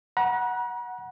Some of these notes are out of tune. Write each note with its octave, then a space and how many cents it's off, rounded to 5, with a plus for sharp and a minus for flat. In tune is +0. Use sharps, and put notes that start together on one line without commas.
F#5 +0 A#5 +45